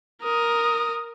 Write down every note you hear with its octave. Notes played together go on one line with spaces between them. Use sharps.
A#4 D#6